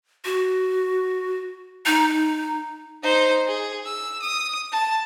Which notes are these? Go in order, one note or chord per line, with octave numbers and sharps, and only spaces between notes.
F#4
D#4
D#4 C5
G#4
E6
D#6
A5